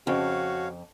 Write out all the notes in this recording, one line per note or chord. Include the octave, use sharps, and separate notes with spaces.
F2 C#3 F#4 C#5 F5